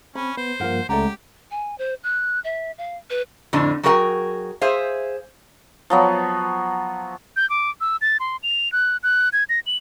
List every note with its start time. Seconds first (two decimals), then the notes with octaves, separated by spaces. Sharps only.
0.15 C4 C#4 B5
0.37 B3 C5
0.60 G2 F3 A#3 A#4 F#5
0.89 C#2 G#3 A3 C#4 G4 D5 F#5 A#5
1.51 G#5
1.78 C5
2.03 F#6
2.44 E5
2.78 F5
3.10 B4
3.53 F2 A2 D3 D4
3.83 F#3 F#4 G#4 A#4 F#5 G5
4.61 G#4 C5 E5 F5
5.90 F3 F#3 B3
7.36 G6
7.50 D6
7.81 E6
8.01 A6
8.20 C6
8.43 F7
8.72 F#6
9.03 F#6
9.33 G#6
9.49 A#6
9.66 F#7